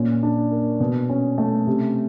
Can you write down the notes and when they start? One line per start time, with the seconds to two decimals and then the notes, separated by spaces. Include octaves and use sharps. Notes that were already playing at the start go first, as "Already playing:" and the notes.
Already playing: A#2 C#4
0.23 D4
0.51 A#3
0.80 B2
1.09 C#4
1.38 A3
1.67 C3